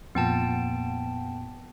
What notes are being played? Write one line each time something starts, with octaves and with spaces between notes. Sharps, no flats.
F2 A#2 B3 G5 A5